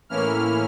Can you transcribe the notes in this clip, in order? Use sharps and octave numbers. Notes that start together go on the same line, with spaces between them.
A2 E3 A#3 C#4 E4 F6